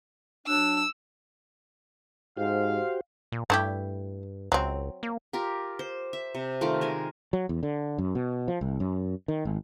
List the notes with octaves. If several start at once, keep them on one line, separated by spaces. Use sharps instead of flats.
F#3 D4 E6
G#2 F#4 G4 C5 F5
A#2
G2 A3 E4 G4
C#2 F#3 C4
A#3
F4 G4 A#4
C5
E5
C3
D#3 A3 F4 D6
G#3 A#4 G#5
F#3
E2
D3
F#2
B2
F3
C2
F#2
D#3
G#1